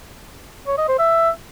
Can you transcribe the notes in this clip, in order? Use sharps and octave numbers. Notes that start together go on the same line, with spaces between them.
C#5
D#5
C5
E5